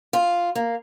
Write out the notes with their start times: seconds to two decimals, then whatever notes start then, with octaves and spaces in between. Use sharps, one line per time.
0.13 F4
0.55 A#3